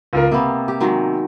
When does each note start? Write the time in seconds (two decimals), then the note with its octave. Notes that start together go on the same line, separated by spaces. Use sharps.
0.13 C#2 F4 A#4
0.31 C3 A#3 B3
0.68 G4
0.80 D#3 F#3 G#3